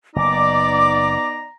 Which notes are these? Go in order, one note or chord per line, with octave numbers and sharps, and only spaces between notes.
F#1 B3 D#4 D5 A#5 D6